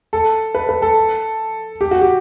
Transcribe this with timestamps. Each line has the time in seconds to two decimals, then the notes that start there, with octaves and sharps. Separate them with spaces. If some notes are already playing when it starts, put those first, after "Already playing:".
0.13 A4
0.55 B4
0.69 B4
0.82 A4
1.81 G4
1.91 F#4
2.01 G4